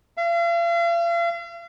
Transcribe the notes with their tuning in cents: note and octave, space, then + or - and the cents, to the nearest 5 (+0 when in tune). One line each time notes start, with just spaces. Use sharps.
F5 -40